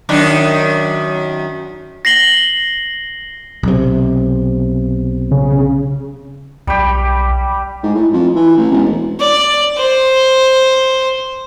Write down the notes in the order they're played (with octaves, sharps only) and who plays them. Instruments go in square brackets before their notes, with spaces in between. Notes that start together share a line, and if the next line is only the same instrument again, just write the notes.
[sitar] F#2 D#3 D4
[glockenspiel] A#6 C7 F#7 G7
[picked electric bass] B1 C3
[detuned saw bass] C#3
[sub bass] B1 [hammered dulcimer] G3 G4
[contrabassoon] G#2
A2
F2
E3
A1
E1
[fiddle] D5
C5